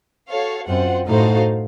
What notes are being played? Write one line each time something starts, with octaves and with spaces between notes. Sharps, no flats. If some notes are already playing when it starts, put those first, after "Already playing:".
F#4 A4 C#5 F5
F#2 C4 F4 C5 F#5
A2 D#4 F#4 A4 C5 F5